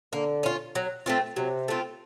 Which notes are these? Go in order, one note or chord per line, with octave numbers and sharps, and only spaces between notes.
D3 A#3
C#4 F4
F#3
A3 C4 F4
C3 F#3
A3 C4 F4